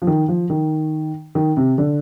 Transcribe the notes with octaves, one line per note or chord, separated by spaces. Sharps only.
F3
D#3
F3
D#3
D#3
C3
D3